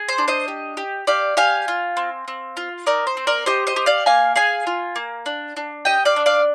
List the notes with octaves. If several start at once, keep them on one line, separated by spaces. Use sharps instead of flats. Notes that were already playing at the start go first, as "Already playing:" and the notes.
Already playing: G#4
C5
D4
C5 D#5
G4
G4
G4 D5 F5
G4 F5 G#5
F4
C4
C4
F4
D#4 A#4 D5
C5
C4
A#4 D5
G4 C5 D#5
C5 D#5
G4
D5 F5
A#3 F5 G#5
G#4 F5 G#5
F4
A#3
D4
D4
G4 D#5 G5
D5 F5
D4
D5 F5